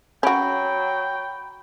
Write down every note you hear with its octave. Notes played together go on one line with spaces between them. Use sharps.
F#3 C#4 F#4 G5 B5 C#6 D7